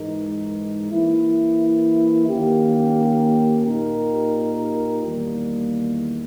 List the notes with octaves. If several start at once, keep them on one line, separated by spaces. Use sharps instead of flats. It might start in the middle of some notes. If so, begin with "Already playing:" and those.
Already playing: G#2 E3 G#3 D#4 A#4
E3 A#3 E4
D#3 A#3 C#4 G4
A#2 A#3 D#4 G4 A#4
E2 D#3 G3 A#3